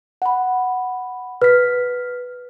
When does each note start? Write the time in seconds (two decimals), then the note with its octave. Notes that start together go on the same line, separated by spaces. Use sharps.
0.22 F#5 B5
1.42 B4 F6 B6